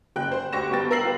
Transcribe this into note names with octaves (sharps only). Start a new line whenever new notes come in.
F#1 G5 F#6
C5
D2 G4 C#6 A#6 E7
G1 B3 G5 A6
A#4 E6 A#6 C7 F#7
B3 F4 G4 B4